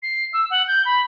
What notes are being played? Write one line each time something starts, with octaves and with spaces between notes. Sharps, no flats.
C7
E6
F#5
G6
B5